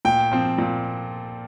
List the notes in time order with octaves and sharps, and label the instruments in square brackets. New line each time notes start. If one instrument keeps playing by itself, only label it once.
[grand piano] A#2 G5
F3 C4
A#2